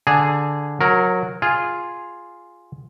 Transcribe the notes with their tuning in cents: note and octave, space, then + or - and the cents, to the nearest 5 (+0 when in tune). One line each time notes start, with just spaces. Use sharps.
D3 +0 G#4 +0 A5 +30
F#3 -20 A#4 +0
F4 +0 G#4 +0